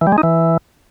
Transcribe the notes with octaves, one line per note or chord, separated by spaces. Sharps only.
E3
G3
G#3
D#4
E3